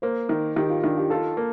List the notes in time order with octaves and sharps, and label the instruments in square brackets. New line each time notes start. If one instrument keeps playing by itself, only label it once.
[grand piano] A#3 [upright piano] C5
[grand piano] D#3
[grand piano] D#3 [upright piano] G4
[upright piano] F4
[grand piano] D#3 [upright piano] D4
[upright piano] G4
[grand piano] F4 [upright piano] A4
[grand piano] A#3